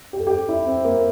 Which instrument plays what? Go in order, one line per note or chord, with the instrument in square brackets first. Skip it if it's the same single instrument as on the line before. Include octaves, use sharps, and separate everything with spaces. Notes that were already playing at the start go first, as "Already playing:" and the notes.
[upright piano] G4
A4
G4
E4
C4
A#3